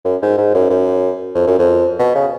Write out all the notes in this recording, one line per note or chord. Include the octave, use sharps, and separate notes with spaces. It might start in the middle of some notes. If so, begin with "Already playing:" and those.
F#2
G#2
G#2
F#2
F#2
F2
F#2
F2
B2
C#3